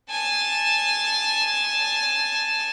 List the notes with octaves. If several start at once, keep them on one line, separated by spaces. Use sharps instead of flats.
G#5 A5